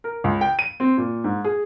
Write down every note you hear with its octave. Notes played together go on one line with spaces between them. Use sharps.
A#4
C#2
G5
D#7
C4
A#2
G#2
G#4